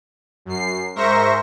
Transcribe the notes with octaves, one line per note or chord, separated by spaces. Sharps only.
F#2 C7
G#2 A#4 C5 E5 C#6 A#6